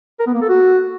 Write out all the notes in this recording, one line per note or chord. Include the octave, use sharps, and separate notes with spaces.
A#4
B3
A#3
A4
F#4